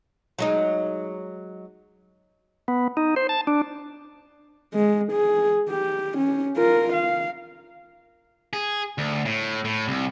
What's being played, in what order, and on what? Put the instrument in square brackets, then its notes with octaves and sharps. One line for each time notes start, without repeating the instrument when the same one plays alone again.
[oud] F#3 G#3 D#4
[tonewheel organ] B3
D#4
C5
A5
D4
[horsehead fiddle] G#3
G#4
G4
C#4
F4 A#4
F5
[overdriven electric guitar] G#4
D2
A2
A2
C2